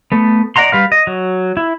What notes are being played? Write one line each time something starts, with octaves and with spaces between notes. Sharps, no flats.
A3 B3
D5 D#5 F#5 A#5 C6
G3 B4 F5
D#5
F#3
E4